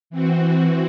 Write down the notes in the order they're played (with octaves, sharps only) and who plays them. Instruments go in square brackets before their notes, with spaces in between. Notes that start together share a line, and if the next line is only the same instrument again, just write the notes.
[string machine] E3 C4 F#4